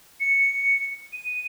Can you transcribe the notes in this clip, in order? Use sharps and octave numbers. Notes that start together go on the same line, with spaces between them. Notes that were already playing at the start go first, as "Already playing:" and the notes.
C#7
D#7